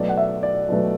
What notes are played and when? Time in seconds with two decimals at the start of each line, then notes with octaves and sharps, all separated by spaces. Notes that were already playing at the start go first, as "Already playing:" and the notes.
Already playing: B1 B2 F#3 A3 D5
0.09 F#5
0.17 E5
0.43 D5
0.68 B1 B2 F#3 A3